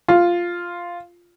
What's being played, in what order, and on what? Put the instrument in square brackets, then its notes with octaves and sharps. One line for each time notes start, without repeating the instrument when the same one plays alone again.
[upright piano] F4